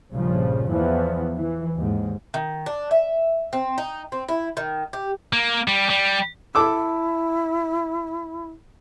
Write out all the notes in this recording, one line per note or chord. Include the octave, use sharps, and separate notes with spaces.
A#1 G2 C#3 F3
E2 E3 F3 B3
E3
D#2 G#2
D#3
D4
E5
C4
D#4
C4
E4
D#3
G4
A#3
G3
G3
E4 A4 D6 E6